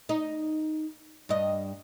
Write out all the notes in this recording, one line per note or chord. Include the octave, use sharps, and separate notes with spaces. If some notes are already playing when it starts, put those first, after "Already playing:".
D#4
G2 D#5